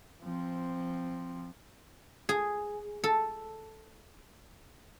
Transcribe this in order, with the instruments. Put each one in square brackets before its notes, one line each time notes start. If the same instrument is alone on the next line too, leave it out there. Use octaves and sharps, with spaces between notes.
[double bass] F3 C4
[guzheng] G#4
A4